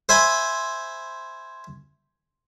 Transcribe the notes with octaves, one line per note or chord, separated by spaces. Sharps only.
C5 E5 G#5 B5